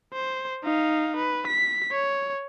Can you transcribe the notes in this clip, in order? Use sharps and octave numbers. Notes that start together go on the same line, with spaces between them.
C5
D#4 F5
B4
B6
C#5